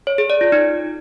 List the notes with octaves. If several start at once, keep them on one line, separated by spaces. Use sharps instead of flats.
C#5
G#4
D5
F4
D#4